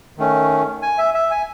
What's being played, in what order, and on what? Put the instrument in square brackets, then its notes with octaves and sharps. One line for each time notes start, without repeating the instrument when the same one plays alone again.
[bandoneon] D#3 A3 C#4
G#5
E5
E5
G#5